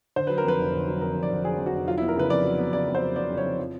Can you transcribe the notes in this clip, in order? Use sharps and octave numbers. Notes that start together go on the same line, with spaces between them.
D3 C5
F#3 B4
A#4
F2 B4
F1
D3
F#3
F2 A#4
F1
D5
D3
F#3 G#4
F2
F#4
F1
F#3 F4
E4
B3
A#4
C#3 B4
F2 D5
F#3
B3
C#3 D5
F2
C5
F#3
B3 D5
C#3
C#5
F2
F3